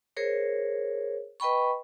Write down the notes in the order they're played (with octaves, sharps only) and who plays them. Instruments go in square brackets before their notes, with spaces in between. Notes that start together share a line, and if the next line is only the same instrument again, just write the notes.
[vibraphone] G#4 A#4 C5 C#5
B4 D#5 G5 B5 C#6